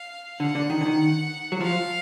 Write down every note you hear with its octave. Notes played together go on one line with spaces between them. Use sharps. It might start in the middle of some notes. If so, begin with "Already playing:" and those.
Already playing: F5
D3 F#5
D3
D#3
D3
D#3
F#3
F3 F5